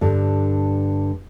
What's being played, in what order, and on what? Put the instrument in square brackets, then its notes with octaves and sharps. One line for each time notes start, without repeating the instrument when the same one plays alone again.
[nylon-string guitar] G2 D3